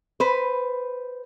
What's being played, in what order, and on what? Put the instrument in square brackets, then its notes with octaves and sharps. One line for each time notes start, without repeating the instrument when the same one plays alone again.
[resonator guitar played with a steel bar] B4 C5